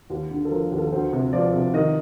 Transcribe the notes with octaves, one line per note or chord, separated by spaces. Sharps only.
D#2
D3
A4
F3 A#4
A4
D#2
A4
D2 C5
C3
F3 D5
C3
D#3 D#5